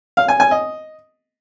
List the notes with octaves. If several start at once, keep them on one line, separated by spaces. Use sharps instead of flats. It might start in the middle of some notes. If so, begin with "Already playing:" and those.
F5
G#5
G#5
D#5